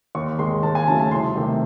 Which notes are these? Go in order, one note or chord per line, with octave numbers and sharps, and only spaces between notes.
D#2 C#6
D#3 G#3 C6
D#2 A5
G#5
C#3 F#3 A3 A5
A5
C2 C6
C3 D#3 A3